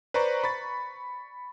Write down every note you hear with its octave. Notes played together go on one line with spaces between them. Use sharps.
B4 C5 D5 A#5 C#6
B5 C#6 A6